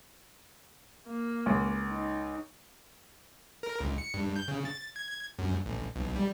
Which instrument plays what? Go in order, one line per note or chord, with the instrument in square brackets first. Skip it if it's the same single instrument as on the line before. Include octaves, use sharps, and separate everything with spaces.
[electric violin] A#3
[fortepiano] C#2
[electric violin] D#4
[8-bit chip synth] A#4
C#2
C#7
G2
G6
C#3
A6
G#6
F#2
A1
B1
G3